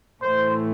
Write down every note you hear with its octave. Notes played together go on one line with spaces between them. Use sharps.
A2 E3 A3 C5